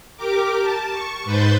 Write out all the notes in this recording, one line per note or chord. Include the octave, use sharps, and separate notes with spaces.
G4 A#4 D6
A5
C#6
G#2 B4 C5 G6 A6